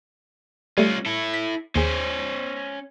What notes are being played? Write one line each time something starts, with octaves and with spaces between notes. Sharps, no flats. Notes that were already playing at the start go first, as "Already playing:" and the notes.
G3 A3 C#4 F4
E4 A4
B6
D#2 C#4 G#4 C5